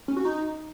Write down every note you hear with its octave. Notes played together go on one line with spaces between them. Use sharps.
C#4
F#4
D#4